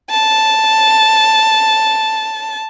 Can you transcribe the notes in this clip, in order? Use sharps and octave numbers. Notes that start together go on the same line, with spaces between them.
A5